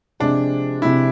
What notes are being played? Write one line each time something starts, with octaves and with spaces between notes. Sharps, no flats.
C3 F3 G#3 D4
C3 F3 G#3 E4